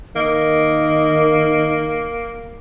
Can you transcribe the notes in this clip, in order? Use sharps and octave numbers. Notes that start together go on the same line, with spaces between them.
D#3 A#3 D#5